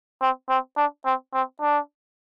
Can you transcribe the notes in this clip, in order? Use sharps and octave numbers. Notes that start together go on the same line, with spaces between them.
C4
C4
D4
C4
C4
D4